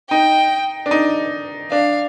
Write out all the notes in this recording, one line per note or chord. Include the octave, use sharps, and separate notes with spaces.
D#4 G5
D4
D#4
D4 F5